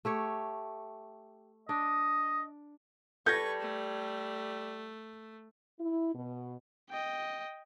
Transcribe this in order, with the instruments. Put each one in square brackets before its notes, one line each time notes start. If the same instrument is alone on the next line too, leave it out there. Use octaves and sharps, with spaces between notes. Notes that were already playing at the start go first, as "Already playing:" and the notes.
[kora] A3 G4 C#5
[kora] D4 [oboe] D#5
[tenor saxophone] G3 [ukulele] A4 [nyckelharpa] B4 C#6 [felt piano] G6 G#6 A#6
[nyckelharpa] A3
[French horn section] E4
B2
[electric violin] D#5 G5